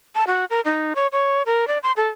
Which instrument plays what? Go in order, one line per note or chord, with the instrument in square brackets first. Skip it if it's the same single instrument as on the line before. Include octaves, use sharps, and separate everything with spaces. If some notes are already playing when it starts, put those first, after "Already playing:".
[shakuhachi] A5
F#4
A#4
D#4
C#5
C#5
A#4
D5
C6
A4